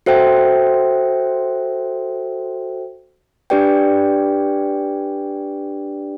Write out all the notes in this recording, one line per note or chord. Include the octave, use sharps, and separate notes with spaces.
F#4 A4 C5 E5 G5
D4 G4 B4 D5 G5